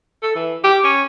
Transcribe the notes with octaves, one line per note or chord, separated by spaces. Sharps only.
A4
E3
G4
C#4